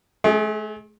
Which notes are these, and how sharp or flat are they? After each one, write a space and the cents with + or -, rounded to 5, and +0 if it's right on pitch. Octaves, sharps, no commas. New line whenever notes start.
A3 -40 G#4 +0